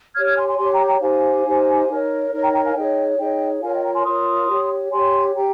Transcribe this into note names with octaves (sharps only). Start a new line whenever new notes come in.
G4 C#5 F6 G#6
F6 G#6
G#5 C6
G#5 C6
G4 C#5 G#5 C6
G5 A#5
G5 A#5
D#4 G4 C5 F5 G#5
D#4 G4 C5
D#4 A#4 C#5
D#4 A#4 C#5
G5 A#5
G5 A#5
F5 G#5
D#4 G#4 C#5 D#5 G5
D#4 G#4 C#5 D#5 G5
F4 A#4 C#5 F5 G#5
D#5 G5
G5 A#5
G#5 C6
F4 A#4 C#5 C6 D#6
G4 C#5
G4 C#5 G#5 C6
G4 G5 A#5